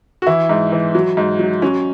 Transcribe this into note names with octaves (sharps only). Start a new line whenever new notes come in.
F#4
E3 E4
G#2
E3
F#3
G#2
F#3
F#3 C#4